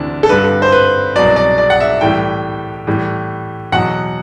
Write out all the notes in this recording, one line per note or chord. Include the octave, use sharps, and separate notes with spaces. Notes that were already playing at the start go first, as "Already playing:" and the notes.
Already playing: D2 C3 E3 D4
A4
G2 D3 G3 B4
C5
B4
C2 B2 F#3 D5
D5
D5
F#5
E5
A2 E3 G3 G5
A2 E3 G3
E2 B2 F#3 F#5